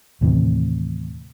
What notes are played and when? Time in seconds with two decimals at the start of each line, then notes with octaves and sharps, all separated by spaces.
0.21 D#2 A2 C3 E3